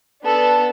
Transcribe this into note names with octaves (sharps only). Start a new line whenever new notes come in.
B3 D4 A4